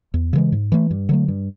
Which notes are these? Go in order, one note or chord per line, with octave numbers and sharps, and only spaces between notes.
E2
C#3 E3 G#3
G#2
E3 A3
G2
D3 F#3 A3
G2